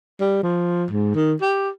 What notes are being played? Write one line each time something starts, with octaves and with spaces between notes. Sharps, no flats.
G3
F3
G#2
D#3
G4